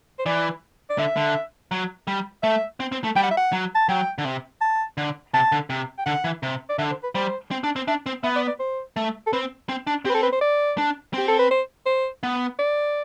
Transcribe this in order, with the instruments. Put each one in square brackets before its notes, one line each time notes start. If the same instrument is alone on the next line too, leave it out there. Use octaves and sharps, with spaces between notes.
[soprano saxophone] C5
[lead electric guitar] E3 [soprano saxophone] D5
[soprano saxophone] D5
[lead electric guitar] D3 [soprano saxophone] E5
[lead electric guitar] D3
F#3
G3
[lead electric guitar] A3 [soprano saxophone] E5
[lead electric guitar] C4
C4
A3
[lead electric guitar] G3 [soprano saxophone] G5
[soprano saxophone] F#5
E5
F#5
[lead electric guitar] F#3
[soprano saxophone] A5
[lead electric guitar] F#3 [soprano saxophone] G5
[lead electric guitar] D3
C3
[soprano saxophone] A5
[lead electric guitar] D3
[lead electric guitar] C3 [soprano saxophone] A5
[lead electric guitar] D3
C3
[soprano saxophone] G5
[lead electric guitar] D3 [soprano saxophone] F#5
[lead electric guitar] E3
C3
[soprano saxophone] D5
[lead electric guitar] D3 [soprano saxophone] E5
[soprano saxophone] C5
B4
[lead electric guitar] G3 [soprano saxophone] C5
[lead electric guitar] C4
D4
C4
[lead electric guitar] D4 [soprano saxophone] E5
[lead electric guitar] C4
[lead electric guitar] B3 [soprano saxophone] E5
[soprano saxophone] D5
D5
C5
[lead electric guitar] A3
[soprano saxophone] A4
[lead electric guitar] C4 [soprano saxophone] B4
[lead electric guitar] C4
D4
[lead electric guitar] C4 [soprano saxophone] G4
[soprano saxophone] B4
A4
B4
C5
D5
[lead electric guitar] D4
[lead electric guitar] C4 [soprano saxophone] G4
[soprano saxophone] A4
B4
C5
C5
[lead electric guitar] B3
[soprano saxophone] D5